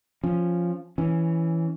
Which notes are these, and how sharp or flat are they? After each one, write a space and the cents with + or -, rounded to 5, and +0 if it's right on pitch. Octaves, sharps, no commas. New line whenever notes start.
F3 +0 C#4 +0
E3 +0 C#4 +0